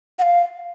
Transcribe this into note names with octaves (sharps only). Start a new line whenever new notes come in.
F#5
F5